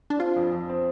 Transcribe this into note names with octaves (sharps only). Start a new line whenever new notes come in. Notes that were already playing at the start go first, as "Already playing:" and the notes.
D4
C4 F4
F2
F2
C4